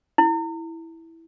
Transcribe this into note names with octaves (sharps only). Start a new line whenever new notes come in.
E4